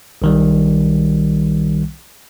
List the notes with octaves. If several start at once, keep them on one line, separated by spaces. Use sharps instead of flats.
B1 D#3 G3